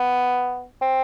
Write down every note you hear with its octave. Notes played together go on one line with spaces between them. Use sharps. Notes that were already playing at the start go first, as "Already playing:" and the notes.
Already playing: B3
C4